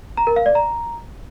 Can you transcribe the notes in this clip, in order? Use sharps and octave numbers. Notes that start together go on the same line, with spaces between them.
A#5
A#4
F5
D5
A#5